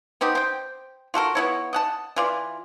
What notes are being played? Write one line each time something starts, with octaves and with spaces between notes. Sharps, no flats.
B3 C4 D#4 G4
C5 G5
F4 F#4 A4 A#4
B3 E4 C#5
D#5 F#5 A5
E3 F4 D5